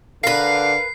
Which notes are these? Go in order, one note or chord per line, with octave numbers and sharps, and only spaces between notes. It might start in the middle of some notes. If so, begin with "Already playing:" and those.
D3 A#4 B4 F5 C7